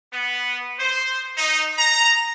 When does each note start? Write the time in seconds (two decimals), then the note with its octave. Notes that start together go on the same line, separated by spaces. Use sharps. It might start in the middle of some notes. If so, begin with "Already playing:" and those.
0.13 B3
0.80 C5
1.37 D#4
1.79 A#5